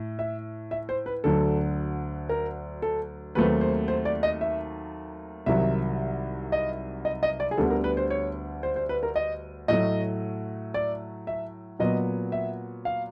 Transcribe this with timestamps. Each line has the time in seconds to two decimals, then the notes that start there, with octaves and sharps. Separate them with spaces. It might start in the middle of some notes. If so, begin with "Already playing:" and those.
Already playing: A2
0.19 E5
0.71 E5
0.89 C5
1.06 B4
1.24 D2 D3 F#3 A4
2.29 A#4
2.82 A4
3.35 D#2 D#3 F#3 A3 C4 B4
3.61 C5
3.88 C5
4.05 D5
4.23 D#5
4.41 E5
5.46 C2 C3 D#3 F#3 E5
6.52 D#5
7.05 D#5
7.23 D#5
7.40 D5
7.51 G#4
7.57 D2 D3 G3 B3 A4
7.70 A#4
7.84 B4
7.97 C5
8.10 C#5
8.63 C5
8.76 C5
8.89 B4
9.03 A#4
9.16 D#5
9.68 A2 F#3 A3 D#5
10.74 D5
11.27 E5
11.79 A#2 F#3 B3 D#5
12.32 E5
12.85 F5